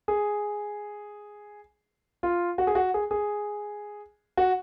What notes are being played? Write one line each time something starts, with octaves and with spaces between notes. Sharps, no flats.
G#4
F4
F#4
G#4
F#4
G#4
G#4
F#4